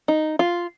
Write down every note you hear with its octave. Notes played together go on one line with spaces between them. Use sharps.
D#4
F4